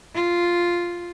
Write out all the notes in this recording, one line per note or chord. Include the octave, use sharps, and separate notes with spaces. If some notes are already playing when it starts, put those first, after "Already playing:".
F4